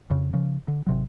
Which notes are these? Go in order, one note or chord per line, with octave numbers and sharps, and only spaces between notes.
F2 C#3
C#3 F3
D3
G#1 C3 F#3